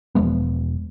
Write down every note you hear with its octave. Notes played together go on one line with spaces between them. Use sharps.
E1 F3 G#3 B3